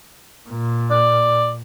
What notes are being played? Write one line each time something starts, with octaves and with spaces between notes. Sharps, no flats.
A#2
D5